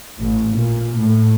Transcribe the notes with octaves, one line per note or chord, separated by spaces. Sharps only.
A1
A#2
A2